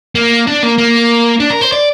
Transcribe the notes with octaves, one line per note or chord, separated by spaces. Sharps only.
A#3
D4
A#3
A#3
D4
A#4
C5
D5